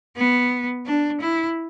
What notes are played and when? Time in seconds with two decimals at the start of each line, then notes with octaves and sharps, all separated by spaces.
0.17 B3
0.86 D4
1.21 E4